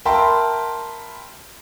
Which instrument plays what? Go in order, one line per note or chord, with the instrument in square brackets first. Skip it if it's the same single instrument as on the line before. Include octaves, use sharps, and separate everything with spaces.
[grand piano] A#4 E5 G5 A5 B5 C6